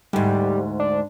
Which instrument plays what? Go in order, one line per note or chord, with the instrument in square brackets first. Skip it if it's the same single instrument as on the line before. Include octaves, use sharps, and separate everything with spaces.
[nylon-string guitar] D2 G#2 [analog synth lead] G3
[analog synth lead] D4